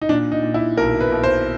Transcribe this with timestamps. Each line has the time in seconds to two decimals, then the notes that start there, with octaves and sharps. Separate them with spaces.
0.02 D#4
0.09 A#2 D4
0.32 D#4
0.43 A#2
0.54 E4
0.77 B1 A#4
1.00 B4
1.12 B1
1.23 C5